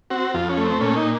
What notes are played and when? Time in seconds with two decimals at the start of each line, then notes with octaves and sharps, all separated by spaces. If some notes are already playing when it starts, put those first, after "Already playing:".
0.10 C4 F#4
0.34 F2 F4
0.49 C#4
0.57 A3
0.65 C4
0.81 A#2 C#4
0.96 D#4